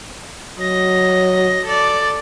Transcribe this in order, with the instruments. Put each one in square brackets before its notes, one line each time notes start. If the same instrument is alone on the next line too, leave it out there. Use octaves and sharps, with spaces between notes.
[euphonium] F#3 [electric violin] D#5 A#6
[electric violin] A4 D5